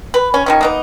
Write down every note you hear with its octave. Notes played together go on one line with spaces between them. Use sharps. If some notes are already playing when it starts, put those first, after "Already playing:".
B4
C#4
D#3 F3 C#4
A#3 B3 D#4